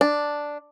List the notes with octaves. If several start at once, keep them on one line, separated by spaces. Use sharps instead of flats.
D4